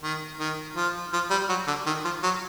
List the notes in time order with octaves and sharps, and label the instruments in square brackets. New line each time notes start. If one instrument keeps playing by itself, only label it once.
[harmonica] D#3
D#3
F3
F3
G3
F#3
D3
D#3
F3
F#3